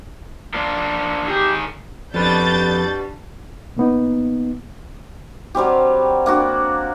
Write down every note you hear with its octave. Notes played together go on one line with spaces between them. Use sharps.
A#3 D4 F4
D#3 G4 G#4
F2 B2 G3 D4 B4 G6 A6
B2 A#3 B3 D#4
F#3 G3 C4 G4
A#3 D4 F#4